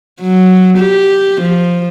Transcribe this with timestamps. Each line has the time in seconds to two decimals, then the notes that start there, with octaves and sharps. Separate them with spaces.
0.21 F#3
0.78 G4
1.42 F3